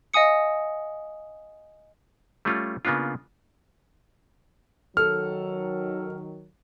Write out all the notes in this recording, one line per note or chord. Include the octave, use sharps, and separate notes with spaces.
D#5 F5 G#5 D#6 C#7
G3 A3 C#4 F4
C#3 A#3 B3 D4 F4
D#3 F#3 A4 F6